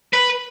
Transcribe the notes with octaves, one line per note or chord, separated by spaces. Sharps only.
B4